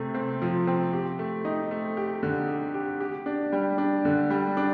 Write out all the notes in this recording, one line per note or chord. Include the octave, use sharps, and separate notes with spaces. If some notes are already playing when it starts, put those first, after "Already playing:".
Already playing: C3 A3 C4
C4
F3
C4
G4
A3
D#4
A3
G4
D3
G4
G4
G4
D4
G3
D4
D3
G3
D4